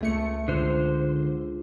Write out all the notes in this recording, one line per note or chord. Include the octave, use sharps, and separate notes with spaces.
C#2 A3 G#4 C#7
C#2 D3 D4 F4 G#4 C5